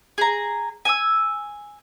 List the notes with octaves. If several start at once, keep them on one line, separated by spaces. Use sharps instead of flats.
G#4 A#5
G#5 E6